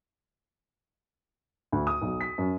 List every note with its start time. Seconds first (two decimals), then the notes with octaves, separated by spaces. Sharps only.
1.72 D2
1.87 D#6
2.02 B1
2.21 B6
2.38 F#2